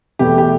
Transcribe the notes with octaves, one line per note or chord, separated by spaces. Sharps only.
E2 B2 A3 G4
G4